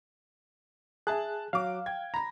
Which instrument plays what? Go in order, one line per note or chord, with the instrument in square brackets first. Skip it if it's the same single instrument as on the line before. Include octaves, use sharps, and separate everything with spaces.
[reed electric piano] G#4 [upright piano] E5 A5 F#6
[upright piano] F#3 D6 [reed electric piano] F5
[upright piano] G5 G#6
[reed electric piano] A#5 [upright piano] B5 A#6